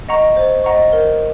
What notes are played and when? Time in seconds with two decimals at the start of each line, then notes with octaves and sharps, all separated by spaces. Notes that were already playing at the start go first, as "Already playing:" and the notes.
0.09 D#5 F#5 A#5 C#6
0.36 C5
0.64 D#5 F#5 A#5 C#6
0.92 A#4